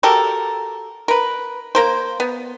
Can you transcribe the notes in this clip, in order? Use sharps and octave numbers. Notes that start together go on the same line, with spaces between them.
F#4 G4 A4 A#4
A#4 B4
A#3 A#4 C5
B3